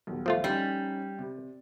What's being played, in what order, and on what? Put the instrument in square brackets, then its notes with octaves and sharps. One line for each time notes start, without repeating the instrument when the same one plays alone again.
[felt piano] D#1 B1
[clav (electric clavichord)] F3 A3 F4
[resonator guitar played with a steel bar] G3 [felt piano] C#4 D#4
[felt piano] C3